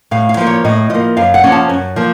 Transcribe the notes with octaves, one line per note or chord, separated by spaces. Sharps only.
A2 F5
F5
F3 A#3
C#5
A2 D#5
F3 A#3 D#5
F#2 F5
F#5
F3 A#3 C#4
A5
F#2
F3 A#3